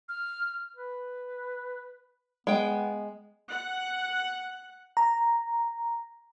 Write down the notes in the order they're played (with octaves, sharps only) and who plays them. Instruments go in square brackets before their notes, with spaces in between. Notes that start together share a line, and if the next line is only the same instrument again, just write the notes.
[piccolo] F6
[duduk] B4
[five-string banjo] G#3 G5 [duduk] B3
[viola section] F#5
[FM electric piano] A#5